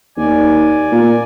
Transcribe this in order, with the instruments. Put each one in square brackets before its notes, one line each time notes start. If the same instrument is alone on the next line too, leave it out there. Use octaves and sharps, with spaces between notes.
[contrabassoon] D#2 [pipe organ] D5 G#5
[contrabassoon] A#2